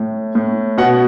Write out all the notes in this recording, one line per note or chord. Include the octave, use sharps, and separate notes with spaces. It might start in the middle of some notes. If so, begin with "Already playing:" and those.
Already playing: A2
A2
B2 F#5